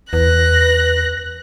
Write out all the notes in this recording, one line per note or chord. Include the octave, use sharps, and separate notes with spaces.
E2 B4 F#6 A#6